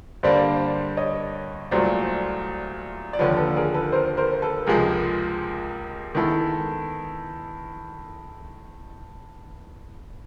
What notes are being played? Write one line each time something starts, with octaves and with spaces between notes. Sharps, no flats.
G2 D3 G3 A#3 D4 C5 D5
C#5 D#5
C2 A#2 F#3 A3 C5 D5
D5
D#2 D3 F3 B4 C#5
A4 B4
G#4 A#4
A4 B4
A#4 C5
A#4 C5
A4 B4
C#2 C3 F3 G#3 G#4 A#4
D#3 G#3 B3 E4 A4